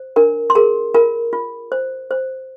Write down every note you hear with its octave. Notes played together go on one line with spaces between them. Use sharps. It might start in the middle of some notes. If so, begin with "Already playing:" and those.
Already playing: C5
D4 A#4 A#5
C6
G#4 A#4 A#5
F4 A#4 A#5
F4
C5
C5